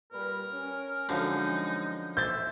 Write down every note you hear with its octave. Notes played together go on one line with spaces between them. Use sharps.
A#2 G3 A#4 B4
C#4
F#2 D3 F3 G#3 D#4
D#2 C5 E5 G6 A6